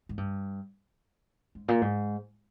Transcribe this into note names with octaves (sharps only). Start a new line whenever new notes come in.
G#2
G2
G#2
A#2
G#2